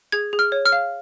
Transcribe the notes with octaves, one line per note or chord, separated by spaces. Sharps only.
G#4 G#6
G#4
F6
C#5
F6
F5